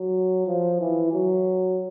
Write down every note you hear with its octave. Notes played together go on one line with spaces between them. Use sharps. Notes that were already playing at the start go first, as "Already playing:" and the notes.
Already playing: F#3
F3
E3
F#3